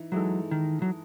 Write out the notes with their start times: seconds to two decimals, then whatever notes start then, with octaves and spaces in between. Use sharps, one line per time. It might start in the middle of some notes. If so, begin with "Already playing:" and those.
Already playing: E3 D#4
0.12 E3 F#3 G#3 D#4 A4
0.51 D#3
0.82 F#3